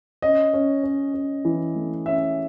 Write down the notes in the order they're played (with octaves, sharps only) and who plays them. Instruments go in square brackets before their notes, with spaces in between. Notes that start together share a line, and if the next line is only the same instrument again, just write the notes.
[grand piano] C#4 D#5
C#4
C#4
C#4
E3
A3
C#4 E5